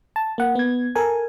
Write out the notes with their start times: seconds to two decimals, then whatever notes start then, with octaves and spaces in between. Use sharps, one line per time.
0.16 A5
0.38 A#3 F#5
0.55 B3 G#6
0.95 A4 A#4 G#5